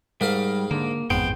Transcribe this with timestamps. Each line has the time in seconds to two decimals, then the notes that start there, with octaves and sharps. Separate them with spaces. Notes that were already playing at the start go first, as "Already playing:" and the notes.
0.21 G#2 G3 A#4 F5
0.71 D3 A#3
1.10 A1 F2 G#2 B3 G5 C6